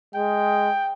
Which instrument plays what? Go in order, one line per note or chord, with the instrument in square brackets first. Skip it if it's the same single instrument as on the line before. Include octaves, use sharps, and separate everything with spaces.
[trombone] G#3 [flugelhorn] G5